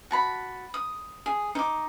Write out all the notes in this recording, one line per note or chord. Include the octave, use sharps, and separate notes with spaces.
F#4 A5 B5
D#6
G#4
D#4 D6